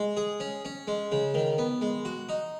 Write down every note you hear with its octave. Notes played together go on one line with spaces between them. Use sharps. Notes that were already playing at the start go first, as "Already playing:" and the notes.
Already playing: G#3
G#4
C#4
C#4
G#3
C#3
D#3
B3
G#3
F#4
D#4